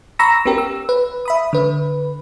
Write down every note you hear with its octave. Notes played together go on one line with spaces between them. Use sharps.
A#5 B5 C#6 E6 A#6
B3 C#4 G4 A#4
E6
B4
E5 B5 D#6
D3 B4